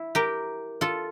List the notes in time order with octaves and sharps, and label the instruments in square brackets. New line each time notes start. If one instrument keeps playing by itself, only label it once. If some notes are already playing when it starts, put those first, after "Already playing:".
Already playing: [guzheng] E4
G4 A#4
F4 A4